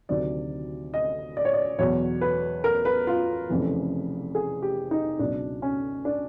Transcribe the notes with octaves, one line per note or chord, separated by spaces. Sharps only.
D2 C3 D#3 F#3 D5
D#5
D5
C#5
D5
E2 B2 F#3 C#5
B4
A#4
B4
F4
F1 F2 C#3 E3
G#4
G4
D#4
C#2 B2 F#3 D4
C#4
D4